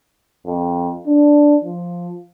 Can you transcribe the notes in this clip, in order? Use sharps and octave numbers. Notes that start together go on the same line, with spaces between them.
F2
D4
F3